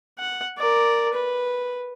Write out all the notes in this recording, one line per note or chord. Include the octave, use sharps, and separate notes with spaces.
F#5
A#4 D5
B4